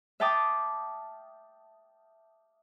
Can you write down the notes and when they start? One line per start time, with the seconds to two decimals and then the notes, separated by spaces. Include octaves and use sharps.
0.20 E5 F5 G5 A5 D6 D#6